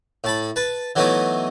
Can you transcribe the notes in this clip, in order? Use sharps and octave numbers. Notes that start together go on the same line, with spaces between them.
A2 A5 B5
B4 A5
E3 F#3 A3 B3 D#4 E4